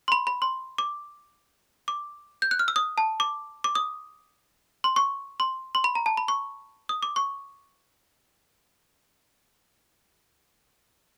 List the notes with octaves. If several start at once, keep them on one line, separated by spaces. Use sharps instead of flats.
C6
B5
B5
C6
D6
D6
G6
F#6
F6
E6
D#6
A5
D6
D6
D#6
C6
C#6
C6
C6
B5
A#5
A5
B5
C#6
D#6
D6
C#6